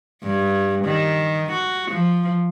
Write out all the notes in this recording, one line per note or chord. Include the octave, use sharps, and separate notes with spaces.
G2
D#3
F#4
F3